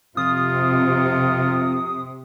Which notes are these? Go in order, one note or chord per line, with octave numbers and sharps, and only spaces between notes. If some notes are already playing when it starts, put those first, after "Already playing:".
F2 C3 F4 D#6